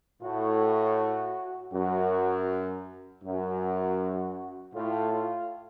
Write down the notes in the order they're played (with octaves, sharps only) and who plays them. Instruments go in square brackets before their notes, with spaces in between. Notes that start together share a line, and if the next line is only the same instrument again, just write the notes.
[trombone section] A2 [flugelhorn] F#4
[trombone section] F#2 [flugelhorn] F#4
[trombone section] F#2 [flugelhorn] F#4
[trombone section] A2 [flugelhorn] F4
[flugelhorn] F4